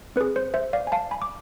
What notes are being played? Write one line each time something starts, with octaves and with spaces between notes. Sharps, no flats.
C4 G#4 B4
C5
C5 E5
D5 F5
G#5
F5 A5
G#5 B5
D6